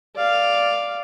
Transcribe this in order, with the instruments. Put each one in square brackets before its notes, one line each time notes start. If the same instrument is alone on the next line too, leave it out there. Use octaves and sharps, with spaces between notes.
[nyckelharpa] D5 F5